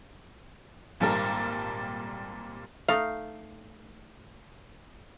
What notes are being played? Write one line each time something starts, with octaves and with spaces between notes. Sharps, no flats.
G#1 A#2 G3 A4 A#4
A3 D#4 F5